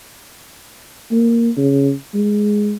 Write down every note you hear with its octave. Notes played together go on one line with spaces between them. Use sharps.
A#3
C#3
G#3